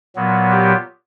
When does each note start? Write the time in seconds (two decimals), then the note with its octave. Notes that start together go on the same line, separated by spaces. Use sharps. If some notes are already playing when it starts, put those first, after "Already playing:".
0.16 A#2 F#3 B3
0.51 G4